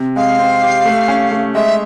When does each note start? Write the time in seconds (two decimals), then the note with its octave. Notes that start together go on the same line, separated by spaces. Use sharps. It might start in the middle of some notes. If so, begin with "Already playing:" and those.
Already playing: C3
0.16 G#3 F5
0.39 C4
0.62 G4
0.85 A3
1.08 C#4
1.31 A3
1.55 G#3 E5